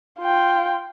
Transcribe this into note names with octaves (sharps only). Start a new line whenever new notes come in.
F4 G5